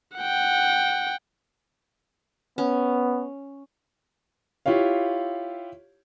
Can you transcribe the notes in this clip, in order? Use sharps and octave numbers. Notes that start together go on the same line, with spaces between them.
F#5 G5
B3 C#4
E4 F4 G4 C#5 F5